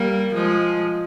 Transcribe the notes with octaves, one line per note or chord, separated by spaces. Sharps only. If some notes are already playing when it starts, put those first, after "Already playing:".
Already playing: G3 A#3
F3 G#3